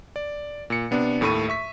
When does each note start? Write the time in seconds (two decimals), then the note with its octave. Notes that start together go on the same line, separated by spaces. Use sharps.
0.16 D5
0.70 A#2 C#7
0.91 C3 B3 D4
1.21 D#2 A2 A3 B5 C#6 D#7
1.49 E5 C#6 B6